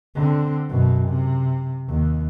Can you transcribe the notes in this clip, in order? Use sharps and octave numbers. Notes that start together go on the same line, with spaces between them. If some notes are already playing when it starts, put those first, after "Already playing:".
D3 C4
F#2 B2
C3
D#2